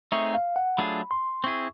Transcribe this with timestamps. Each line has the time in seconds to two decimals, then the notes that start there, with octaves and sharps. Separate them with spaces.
0.12 A3 C4 D#4 G#4 C#5 E5
0.34 F5
0.56 F#5
0.77 F#3 A3 D4 F4 G#4 B5
1.11 C6
1.44 C4 E4 G#4 C#6